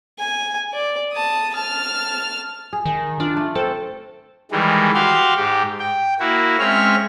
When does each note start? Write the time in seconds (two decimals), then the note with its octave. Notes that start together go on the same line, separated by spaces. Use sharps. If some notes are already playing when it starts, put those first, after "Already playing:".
0.19 G#5
0.73 D5
1.13 A5 D#6
1.54 A5 F6
2.73 G#4
2.85 D#3
3.20 D4 F4
3.37 A3
3.55 C4 A4
4.51 D#3 E3 G3 G#3
4.94 F#4 G4 F5 C6
5.36 G#2 G4
5.80 G5
6.20 A#3 E4 F#4
6.59 G#3 C4 C#4 C#5 E5 F6